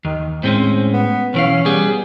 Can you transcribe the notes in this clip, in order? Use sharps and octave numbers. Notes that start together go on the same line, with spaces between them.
D#2 D#3
A2 G#3 C4 C#4
B3
B1 E3 C#4 F5
G3 B3 G#4